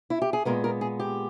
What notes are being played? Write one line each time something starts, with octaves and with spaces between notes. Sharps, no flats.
E4
G4
G#4
A#2 G#3 B3 A#4
A#4
G#4
G4